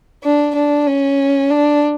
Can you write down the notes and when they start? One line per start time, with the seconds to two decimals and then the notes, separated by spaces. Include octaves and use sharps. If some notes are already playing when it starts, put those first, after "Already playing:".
0.24 D4
0.55 D4
0.87 C#4
1.50 D4